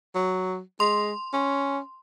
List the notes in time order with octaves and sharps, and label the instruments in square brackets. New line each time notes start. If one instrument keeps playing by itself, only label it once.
[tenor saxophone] F#3
[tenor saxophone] G#3 [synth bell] C6
[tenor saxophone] C#4